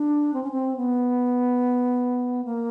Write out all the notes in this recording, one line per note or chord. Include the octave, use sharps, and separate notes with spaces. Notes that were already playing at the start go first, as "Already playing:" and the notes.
Already playing: D4
C4
C#4
C4
B3
A#3